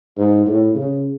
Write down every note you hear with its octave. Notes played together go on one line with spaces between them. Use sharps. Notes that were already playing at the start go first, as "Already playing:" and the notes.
G#2
A2
C#3